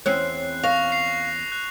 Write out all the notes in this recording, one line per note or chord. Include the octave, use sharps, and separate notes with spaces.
E2 C4 C#4 F#6 C7
F5 C#6 A#6 F7
C7 F7
F#6